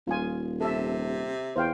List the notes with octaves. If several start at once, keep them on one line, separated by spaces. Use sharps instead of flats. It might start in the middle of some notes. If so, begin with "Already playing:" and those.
D#1 F4 G#5
C3 A4 E5
E2 C5 F5 G5